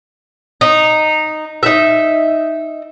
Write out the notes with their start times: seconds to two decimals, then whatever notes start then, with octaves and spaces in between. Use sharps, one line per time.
0.61 D#4
1.63 D#4 E5